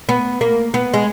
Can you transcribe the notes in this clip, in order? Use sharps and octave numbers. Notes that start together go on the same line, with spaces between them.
B3
A#3
B3
G#3